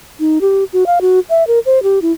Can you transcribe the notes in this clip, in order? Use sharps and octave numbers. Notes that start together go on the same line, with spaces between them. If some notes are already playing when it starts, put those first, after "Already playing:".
D#4
G4
F#4
F5
F#4
E5
A#4
C5
G4
E4